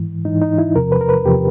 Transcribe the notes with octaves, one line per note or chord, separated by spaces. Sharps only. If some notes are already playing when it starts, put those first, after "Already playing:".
Already playing: G#2 E3
G#2 E3 D#4
D#4
E4
E2 C3 F3 A#4
B4
A#4
B4
E2 C3 F3 G4